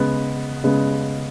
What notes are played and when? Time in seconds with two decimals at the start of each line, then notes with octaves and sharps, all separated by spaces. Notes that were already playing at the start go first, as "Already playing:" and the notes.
Already playing: C#3 G#3 B3
0.64 C#3 G#3 B3